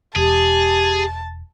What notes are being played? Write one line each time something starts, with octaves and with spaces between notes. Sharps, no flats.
E1 G4 G#4 A5